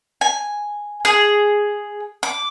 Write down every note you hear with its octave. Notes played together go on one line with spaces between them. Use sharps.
G#5
G#4
D6